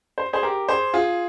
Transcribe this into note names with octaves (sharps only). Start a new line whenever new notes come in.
C5
G#4 C5
G4 A#4
G#4 C5
F4 G#4